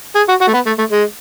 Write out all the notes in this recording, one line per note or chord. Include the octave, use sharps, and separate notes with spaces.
G#4
F#4
F#4
A3
B3
A3
A3
G#3